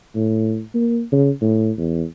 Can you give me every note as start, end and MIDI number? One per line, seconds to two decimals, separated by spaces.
0.15 0.61 45
0.74 1.02 58
1.12 1.30 49
1.41 1.71 45
1.78 2.04 40